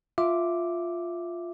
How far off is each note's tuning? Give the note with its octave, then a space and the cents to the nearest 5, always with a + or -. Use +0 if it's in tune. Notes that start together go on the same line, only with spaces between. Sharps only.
F4 +0 E5 +0 D6 +0